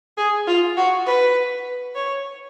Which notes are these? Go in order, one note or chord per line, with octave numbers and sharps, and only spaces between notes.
G#4
F4
F#4
B4
C#5